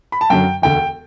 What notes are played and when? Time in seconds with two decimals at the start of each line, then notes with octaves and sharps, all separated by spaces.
0.12 B5
0.21 A5
0.30 F#2 D3 F#3 G5
0.62 E1 D2 D3 G5